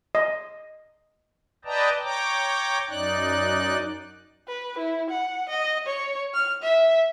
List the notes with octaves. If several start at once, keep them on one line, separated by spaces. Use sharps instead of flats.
D#5
B4 D5 D#5 G5 A5 A#5
C#5 G5 A#5 D6
F#2 D#4 D5 F#6
B4
E4
F#5
D#5
C#5
F6
E5